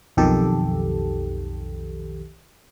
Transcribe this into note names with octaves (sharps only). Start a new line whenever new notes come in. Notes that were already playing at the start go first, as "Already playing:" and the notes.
B1 F2 D#3 G4 A4